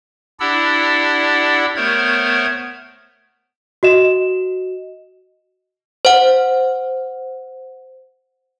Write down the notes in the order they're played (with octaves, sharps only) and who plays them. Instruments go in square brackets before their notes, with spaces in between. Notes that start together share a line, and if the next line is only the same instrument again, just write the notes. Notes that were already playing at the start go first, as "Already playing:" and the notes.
[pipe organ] D4 E4 G4 D5 F#5 E6
A3 B3 A#4 C5 C#5 G#6
[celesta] F#4 D#5 E7
[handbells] C5 F#5